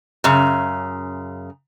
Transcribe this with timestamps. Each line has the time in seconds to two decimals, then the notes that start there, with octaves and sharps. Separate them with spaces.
0.24 F#2 C#3